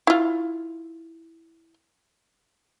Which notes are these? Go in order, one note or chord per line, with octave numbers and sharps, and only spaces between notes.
E4 F4